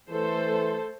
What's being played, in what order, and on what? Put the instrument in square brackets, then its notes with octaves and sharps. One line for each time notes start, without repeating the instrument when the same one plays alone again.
[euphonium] E3 [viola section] A3 A4 C5